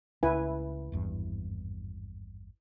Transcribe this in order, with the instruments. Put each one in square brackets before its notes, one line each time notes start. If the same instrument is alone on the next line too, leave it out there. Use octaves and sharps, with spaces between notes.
[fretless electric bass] C#2 [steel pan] E4 B4 G#5
[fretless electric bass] G#1 E2 G2